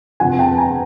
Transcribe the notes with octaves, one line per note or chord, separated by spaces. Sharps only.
F2 C3 F3 F#5 G#5
G5 A5
G#5 A#5